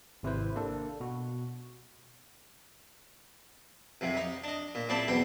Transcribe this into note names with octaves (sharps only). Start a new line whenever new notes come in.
G#1 C3 E4 B4 C5
A#3 D4 A4
B2 F#4
C2 F2 C3
D#4
D4 D#5
A#2
A#1 C4 E4 D5 G5 A5
B1 E2 C4 B4 G5